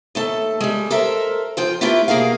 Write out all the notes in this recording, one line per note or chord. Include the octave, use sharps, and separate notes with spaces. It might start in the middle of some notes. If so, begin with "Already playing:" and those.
D#2 A3 A4
G3 G#3
A4 A#4 C5 E5
F3 F4 G5
A3 E4 F4 G4 A#4 B4
B2 A#3 G#4 A#4 F5